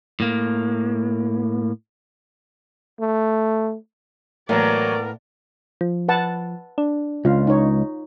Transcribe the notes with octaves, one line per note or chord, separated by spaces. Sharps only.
A2 A#3
A3
A2 E3 F#3 A#3 B3 A#4 D5
F3
B4 F#5 A5
D4
C#2 F4 F5
D#4 C#5